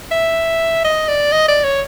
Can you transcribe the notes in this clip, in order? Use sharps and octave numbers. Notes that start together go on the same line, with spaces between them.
E5
D#5
D5
D#5
D5
C#5